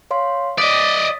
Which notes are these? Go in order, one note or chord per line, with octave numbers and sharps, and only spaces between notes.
C#5 F5 C6
D5 D#5 D#6 A6 B6